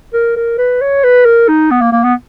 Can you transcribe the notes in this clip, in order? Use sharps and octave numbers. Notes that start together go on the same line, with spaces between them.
A#4
A#4
B4
C#5
B4
A#4
D#4
B3
A#3
A#3
B3